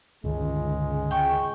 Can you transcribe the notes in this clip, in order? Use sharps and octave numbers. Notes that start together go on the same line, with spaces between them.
C#2 G2 D3 D#3 G#3
G5 C#6